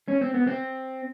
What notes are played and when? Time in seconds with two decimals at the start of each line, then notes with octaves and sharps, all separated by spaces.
0.08 C#4
0.21 C4
0.34 B3
0.47 C4